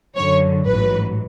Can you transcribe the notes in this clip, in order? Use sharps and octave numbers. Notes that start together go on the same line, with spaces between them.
F#2 D3 F#3 C#5
A1 G#2 F#3 B4